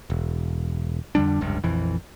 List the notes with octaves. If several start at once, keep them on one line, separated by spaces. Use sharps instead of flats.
E1
F2 D3 G3 D4
F1 C#2 G2
A#1 F2 E3